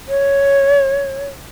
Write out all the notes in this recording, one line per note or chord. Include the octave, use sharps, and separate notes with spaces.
C#5